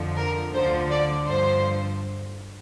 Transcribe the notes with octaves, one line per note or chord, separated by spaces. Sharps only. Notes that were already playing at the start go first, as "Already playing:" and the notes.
Already playing: F2 D3 F3
A#4
D2 D3 F3 C5
D5
G2 D3 F3 C5